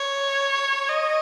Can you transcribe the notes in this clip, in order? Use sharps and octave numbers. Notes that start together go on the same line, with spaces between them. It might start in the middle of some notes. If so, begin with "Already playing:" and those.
Already playing: C#5
D#5